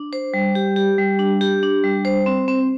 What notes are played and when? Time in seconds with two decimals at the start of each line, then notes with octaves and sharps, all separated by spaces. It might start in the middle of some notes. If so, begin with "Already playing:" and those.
Already playing: D4
0.13 C5
0.34 G3
0.55 G4
0.76 G4
0.98 G3
1.19 D4
1.41 G4
1.63 D4
1.83 G3
2.05 C5
2.26 C4
2.48 C4